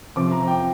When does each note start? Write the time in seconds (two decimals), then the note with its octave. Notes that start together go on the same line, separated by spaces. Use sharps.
0.16 C3 F3 D6
0.32 A#5
0.48 G5